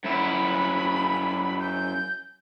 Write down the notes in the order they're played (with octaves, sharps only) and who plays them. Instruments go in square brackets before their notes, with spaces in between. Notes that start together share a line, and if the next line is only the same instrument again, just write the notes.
[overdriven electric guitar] F#2 E4 [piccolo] B5
[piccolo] G6